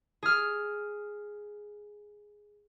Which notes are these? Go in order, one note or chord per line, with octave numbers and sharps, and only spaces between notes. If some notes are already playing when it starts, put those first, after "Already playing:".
G#4 F6